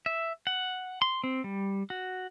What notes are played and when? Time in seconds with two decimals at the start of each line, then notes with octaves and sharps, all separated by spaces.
0.06 E5
0.47 F#5
1.02 C6
1.24 C4
1.44 G3
1.90 F#4